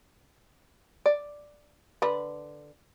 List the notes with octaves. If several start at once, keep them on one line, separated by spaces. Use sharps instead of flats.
D5
D3 B4